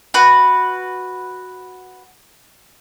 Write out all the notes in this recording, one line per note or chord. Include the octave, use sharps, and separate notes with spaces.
F#4 B4